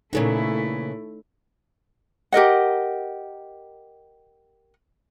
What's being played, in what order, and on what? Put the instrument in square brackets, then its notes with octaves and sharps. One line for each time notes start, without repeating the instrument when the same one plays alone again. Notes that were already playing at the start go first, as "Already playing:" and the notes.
[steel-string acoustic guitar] A#2 C#3 E3 [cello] A3 E4 [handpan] D#4 A4 C#5
[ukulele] G4 A#4 D#5 F#5